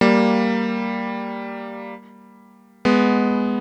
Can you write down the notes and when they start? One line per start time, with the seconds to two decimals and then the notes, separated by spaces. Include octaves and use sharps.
0.01 G3 A#3
2.85 G#3 B3